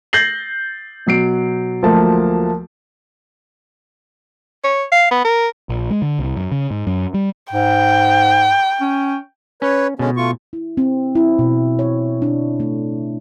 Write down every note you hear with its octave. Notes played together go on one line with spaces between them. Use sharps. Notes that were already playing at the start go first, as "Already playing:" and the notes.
G6 A6 A#6 C7 F#7
B2 F#3 C7 D7
D2 F3 F#3 A3 A#3 A5
C#5
F5
B3
A#4
A#1
G#3
D3
C2
F#2
C#3
G#2
F#2
G3
G#2 G5
C#4
C#4 B4 C#5
B2 D3 G#3 C#4
A3 F4 C#6
E4
C4
E4
B2
C#5
D4
A3